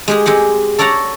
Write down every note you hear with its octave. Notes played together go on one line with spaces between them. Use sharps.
G#3 G4 G#4
G#3 C4 G4 F#5
A4 C#5 D5 F#5 A#5